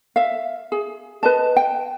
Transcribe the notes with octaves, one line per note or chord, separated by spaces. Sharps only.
E5 F5
G#4
B4 D#5 A5
G5